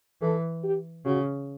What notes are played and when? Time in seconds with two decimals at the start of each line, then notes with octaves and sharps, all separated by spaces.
0.21 E3 A4
0.64 G4
1.05 C#3 F#4